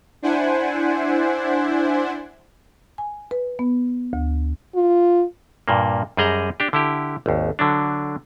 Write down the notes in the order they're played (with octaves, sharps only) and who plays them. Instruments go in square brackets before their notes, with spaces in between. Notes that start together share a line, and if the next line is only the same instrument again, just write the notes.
[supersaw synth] D4 E4 C5 F#5 G#5
[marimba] G#5
B4
B3
D2
[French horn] F4
[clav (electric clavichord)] G2 A#2 A#3
F#2 G3 G#4 D#5 A#5
D4 G4
D3 E4 G4
G#1 D#2
D3 F#3 D4